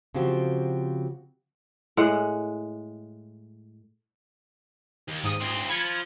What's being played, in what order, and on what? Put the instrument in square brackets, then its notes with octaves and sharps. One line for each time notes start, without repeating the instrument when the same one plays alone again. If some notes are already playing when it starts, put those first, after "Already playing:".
[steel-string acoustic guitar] C#3 F3 C4 F#4 G4
[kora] A2 G#3 F#5
[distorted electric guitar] D#2
[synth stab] G#2 D#6
[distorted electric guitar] D2 C4
[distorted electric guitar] F3 [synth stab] B5 G#6 C#7